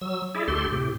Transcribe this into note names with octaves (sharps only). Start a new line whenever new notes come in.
F#3 E6
E4 G#4 D5 E5
D2 G4 A4 C6
A2 C3 G4